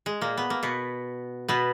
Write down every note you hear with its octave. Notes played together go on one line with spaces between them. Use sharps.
G#3
A#2 A#3
B3
A#3
B2 B3
B2 B3